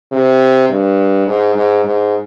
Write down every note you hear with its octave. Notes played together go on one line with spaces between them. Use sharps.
C3
G2
G#2
G#2
G#2